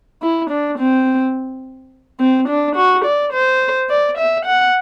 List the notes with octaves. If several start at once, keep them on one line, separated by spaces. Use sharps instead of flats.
E4
D4
C4
C4
D4
F#4
D5
C5
D5
E5
F#5